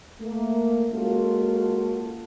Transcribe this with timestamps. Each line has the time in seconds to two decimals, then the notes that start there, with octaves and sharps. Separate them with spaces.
0.21 A3 A#3
0.92 G#3 A#3 C#4 F4 F#4 A4